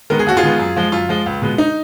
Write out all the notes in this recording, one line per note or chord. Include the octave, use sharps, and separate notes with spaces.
D#3 G#3 B3 A#4
G#4
D#2 F#4
F4 G#4
D#3 G#3 B3
F#2
F3 G#3
F#2 F4
F3 G#3
C#2
B2 G#3 B3
D#4